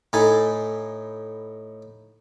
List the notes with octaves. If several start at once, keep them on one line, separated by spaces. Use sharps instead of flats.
A2 D#4 A4 G#5 B5